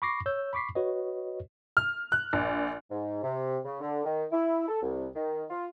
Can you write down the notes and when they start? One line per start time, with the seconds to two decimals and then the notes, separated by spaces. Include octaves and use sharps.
0.02 B5 C#6 D6 A#6 C7
0.26 C#5 E6 G6
0.53 B5 C#6 D6 B6 C7
0.75 F#4 B4 C#5 D#5
1.77 F6
2.12 F#6
2.33 A#1
2.91 G#2
3.23 C3
3.65 C#3
3.81 D3
4.05 D#3
4.32 E4
4.69 A4
4.83 C2
5.15 D#3
5.50 F4